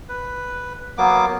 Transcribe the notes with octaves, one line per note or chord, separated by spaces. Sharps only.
B4
F#3 A#3 B3 D6